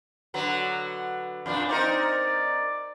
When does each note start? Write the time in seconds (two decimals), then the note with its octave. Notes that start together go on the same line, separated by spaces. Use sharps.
0.34 D3 F#3 B3
1.46 F2 A#2 D4
1.69 C4 D#4 A#4 D5